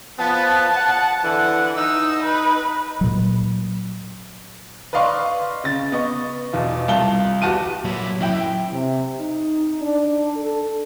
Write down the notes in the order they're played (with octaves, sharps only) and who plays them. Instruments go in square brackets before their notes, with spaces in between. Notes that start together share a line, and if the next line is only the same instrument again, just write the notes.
[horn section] F3 B3 [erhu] A5
[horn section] F#5
D3 E3 F#5
[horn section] D#4 [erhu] E6
[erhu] B4
[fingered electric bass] A#2 F#3
[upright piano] B4 D5 D#5 F5 C6 C#6
C#3 A6
B3 D#5 C#6
E2 B2 E3 F4
C2 F4 A5 G7
E2 F#4 G4 A5 D#7
[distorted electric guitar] A#2 E4 [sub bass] F#3
[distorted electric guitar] F#2 E3 [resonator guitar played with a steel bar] E4 E5 G5
[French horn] C3
D#4
D4
A4